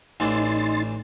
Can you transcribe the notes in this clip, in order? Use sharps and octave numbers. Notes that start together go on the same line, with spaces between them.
A1 E3 D4 D#4 C6 A6